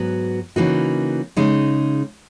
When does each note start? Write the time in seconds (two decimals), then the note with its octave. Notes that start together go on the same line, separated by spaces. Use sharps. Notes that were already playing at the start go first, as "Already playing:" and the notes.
Already playing: G#2 F#3 B3 F#4
0.56 C#3 E3 A#3 D#4 F#4
1.36 C#3 G#3 D#4